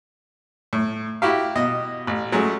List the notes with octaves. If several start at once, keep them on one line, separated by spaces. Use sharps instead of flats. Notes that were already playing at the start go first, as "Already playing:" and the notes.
A2
E4 F#4 G4 F5
B2 D#5
A1
F#3 G#3 A3 C#4